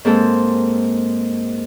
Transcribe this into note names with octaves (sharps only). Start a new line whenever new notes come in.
G#2 A#3 C4 A4